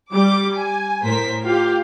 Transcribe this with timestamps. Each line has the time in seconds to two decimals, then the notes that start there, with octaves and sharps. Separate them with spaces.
0.11 G3 D6
0.54 G#5
1.02 A2 A#4 C5 B6
1.44 F4 G4 F5